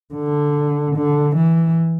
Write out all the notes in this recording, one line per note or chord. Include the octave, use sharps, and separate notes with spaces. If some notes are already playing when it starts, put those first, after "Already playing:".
D3
D3
E3